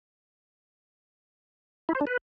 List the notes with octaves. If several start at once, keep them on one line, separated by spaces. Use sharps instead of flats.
E4
C5
D4
B4